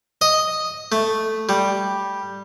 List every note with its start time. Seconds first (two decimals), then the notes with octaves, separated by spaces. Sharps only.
0.21 D#5
0.92 A3
1.49 G3